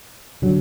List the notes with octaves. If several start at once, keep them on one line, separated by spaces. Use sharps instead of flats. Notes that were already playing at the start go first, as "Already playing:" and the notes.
D3 F#3